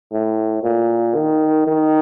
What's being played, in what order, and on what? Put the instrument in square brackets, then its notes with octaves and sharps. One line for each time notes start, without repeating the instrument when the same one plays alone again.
[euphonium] A2
A#2
D#3
D#3